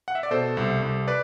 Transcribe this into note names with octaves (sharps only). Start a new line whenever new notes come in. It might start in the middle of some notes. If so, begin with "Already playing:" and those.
F#5
E5
D5
B2 A4 C5
C2
C2
B4 D5